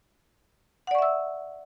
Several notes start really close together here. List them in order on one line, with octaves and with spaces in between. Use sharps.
F#5 D5 C#6 E5 E6